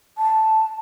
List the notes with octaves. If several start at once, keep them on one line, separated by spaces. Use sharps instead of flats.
A5